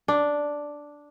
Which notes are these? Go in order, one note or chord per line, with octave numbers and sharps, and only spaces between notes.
D4